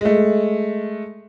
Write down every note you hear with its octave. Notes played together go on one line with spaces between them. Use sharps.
G#3 A3